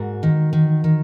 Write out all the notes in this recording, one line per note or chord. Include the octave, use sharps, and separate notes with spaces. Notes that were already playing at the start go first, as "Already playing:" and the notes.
Already playing: G#2 F#4 A#4
D#3
D#3
D#3